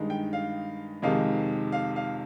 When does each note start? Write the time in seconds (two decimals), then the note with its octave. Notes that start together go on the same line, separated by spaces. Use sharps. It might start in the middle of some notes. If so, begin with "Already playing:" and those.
Already playing: G2 D#3 G#3 D#4
0.10 G5
0.33 F5
1.02 F2 C3 D#3 G#3 D#4 F5
1.72 F5
1.96 F5